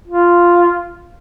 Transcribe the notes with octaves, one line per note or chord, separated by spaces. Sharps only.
F4